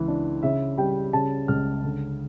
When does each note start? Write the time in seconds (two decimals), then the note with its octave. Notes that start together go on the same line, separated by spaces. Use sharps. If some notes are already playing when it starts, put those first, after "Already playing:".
Already playing: C#2 E3
0.08 D4
0.43 C#3 E5
0.77 G3 G5
1.13 C#3 A5
1.48 C#2 F6
1.84 D3